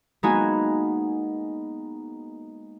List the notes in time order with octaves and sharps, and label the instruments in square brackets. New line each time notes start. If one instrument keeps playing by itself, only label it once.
[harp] G#3 A#3 B3 D#4 F#4 G#5